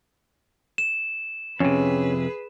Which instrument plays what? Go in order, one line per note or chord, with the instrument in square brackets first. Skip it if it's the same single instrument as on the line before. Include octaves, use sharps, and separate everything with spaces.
[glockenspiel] E7
[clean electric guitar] F2 C3 [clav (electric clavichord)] C#4 [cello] G#4 B4